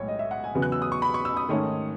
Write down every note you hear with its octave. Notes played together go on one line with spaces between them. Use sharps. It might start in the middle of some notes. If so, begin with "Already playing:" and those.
Already playing: B1 A2 G#3 C#5
D#5
E5
F#5
G#5
E2 C#3 F#3 B3
F#6
E6
D#6
C#6
B5
C#6
E6
D#6
G#2 D#3 A3 C#4